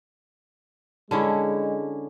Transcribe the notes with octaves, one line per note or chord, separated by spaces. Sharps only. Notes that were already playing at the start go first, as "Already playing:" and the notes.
D3 G#3 C#4 E4